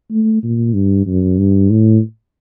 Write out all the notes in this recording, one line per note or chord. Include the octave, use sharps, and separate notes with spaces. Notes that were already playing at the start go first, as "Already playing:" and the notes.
A3
A#2
G2
F#2
G2
A2